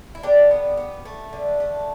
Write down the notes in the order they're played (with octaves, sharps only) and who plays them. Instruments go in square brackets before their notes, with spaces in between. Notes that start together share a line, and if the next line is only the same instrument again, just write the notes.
[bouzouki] E4
D3 D4 G4
B3
B3
A3
D3
A3